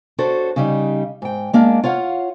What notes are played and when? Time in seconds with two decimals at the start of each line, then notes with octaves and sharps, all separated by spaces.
0.18 D4 F#4 A4 C5 C#5
0.56 C#3 G3 D#4
1.22 G#2 G5
1.53 G#3 A#3 D4
1.83 F4 C#5 F5 F#5